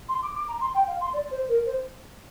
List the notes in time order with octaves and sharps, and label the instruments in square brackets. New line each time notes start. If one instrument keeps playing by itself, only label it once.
[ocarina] C6
D6
D6
A#5
C6
G5
F5
C6
D5
C5
A#4
C5